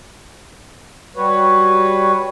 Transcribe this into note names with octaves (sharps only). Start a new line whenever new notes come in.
G3 F#4 B4 C#5